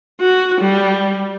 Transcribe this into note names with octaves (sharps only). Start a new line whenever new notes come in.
F#4
G3